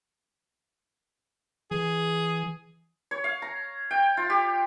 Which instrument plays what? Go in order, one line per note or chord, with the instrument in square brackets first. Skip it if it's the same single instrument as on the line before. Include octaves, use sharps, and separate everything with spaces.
[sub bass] E3 [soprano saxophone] G#4
[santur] C#5
F5
A#5
G5
F4
G4